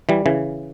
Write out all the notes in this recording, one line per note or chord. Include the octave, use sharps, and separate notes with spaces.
E3 G3
C#3 E3